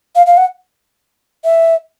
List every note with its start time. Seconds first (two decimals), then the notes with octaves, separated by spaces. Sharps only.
0.15 F5
0.27 F5
0.37 F#5
1.44 E5